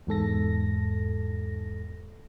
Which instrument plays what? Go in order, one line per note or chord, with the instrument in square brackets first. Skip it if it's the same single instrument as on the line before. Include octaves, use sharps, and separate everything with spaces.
[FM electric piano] E2 G#2 A4 A#6